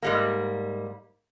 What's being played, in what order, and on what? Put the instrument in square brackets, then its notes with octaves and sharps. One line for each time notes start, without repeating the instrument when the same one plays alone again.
[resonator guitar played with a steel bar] G#2 G3 A#3